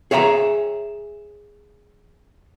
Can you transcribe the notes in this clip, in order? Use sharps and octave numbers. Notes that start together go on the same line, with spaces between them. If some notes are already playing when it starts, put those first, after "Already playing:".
G#4 C#5 E5 F#5 A#5